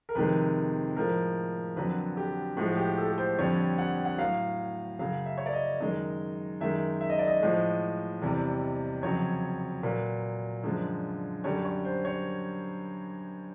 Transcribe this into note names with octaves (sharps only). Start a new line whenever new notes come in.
A#4
F2 C3 D#3 G#3 B4
A2 F3 G#3 A#4
F2 D3 F#3 B4
G4
A2 F3 G#3 F#4
G4
A4
C5
F2 D3 G3 C#5
F#5
F#5
A2 F#3 F5
F#2 C#3 F#3 F5
E5
C#5
D5
D#5
F#2 D#3 G#3 D#5
F#2 D#3 G#3 E5
E5
D#5
D5
D#5
A2 F3 G#3
E2 C3 E3 G3
F2 C#3 F#3 C#5
A#2 F#3 B4
F#2 D3 F3 G#3
F#2 D3 G3 C#5
C#5
C5
C#5